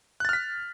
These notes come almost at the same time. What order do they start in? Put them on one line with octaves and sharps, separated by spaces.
F#6 A6 F6 B6